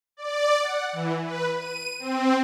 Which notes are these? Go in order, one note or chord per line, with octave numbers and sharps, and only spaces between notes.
D5
F#5
E3
B4
D#7
C4